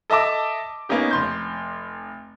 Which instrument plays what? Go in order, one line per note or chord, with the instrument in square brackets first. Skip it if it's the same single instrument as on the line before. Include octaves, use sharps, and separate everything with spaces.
[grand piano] A4 D#5 E5 A5 D6
A#3 B3 C#4 D#4 G4
F1 C6 G6